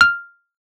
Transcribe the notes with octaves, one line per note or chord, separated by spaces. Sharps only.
F6